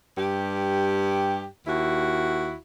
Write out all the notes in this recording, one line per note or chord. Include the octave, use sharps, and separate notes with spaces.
G2 G4
D#2 E4 F#4